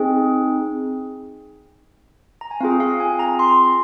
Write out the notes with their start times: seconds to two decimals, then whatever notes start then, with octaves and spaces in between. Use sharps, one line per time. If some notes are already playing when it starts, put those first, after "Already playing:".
Already playing: C4 D#4 G#4
2.41 A#5
2.51 G#5
2.60 C4 F4 G#4 F5
2.80 F5
3.00 G#5
3.19 A#5
3.39 C6